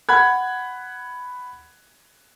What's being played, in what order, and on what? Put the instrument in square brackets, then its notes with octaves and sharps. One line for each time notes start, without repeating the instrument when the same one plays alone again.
[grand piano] F#5 B5 F#6 G#6